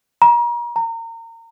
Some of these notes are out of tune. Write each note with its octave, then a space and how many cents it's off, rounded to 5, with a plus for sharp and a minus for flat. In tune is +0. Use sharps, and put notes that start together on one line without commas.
A#5 +35
A#5 -30